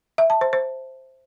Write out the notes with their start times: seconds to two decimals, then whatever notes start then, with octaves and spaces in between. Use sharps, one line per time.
0.18 E5
0.30 A5
0.41 C5
0.53 C5